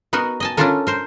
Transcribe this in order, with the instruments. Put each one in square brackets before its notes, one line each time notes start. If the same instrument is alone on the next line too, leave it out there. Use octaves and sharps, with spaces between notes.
[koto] B3 D#4 F#4 A#4
D#5 G#5 A5
C#4 D4 E4 F4 A4 A#4
A#4 C5